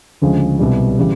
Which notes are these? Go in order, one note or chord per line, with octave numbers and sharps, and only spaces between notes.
D2 C#3 F3 G#3
C2 B2 G3
C#3 E3 G3